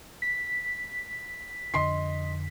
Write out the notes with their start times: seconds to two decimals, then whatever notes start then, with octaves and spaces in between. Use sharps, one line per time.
0.22 B6
1.74 F2 D3 D4 D#5 C6 C7